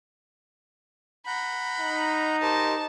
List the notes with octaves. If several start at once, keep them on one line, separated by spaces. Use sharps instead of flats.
F#5 A#5 B5 G6
D#4
G4 A#4 C5 A5